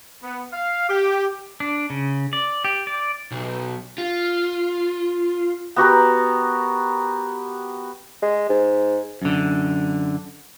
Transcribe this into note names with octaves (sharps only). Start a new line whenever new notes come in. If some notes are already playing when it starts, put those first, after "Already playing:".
B3
F5
G4
D4
C#3
D5
G4
D5
B1
F4
B3 F#4 G4 A#4
G#3
G#2
F#2 D3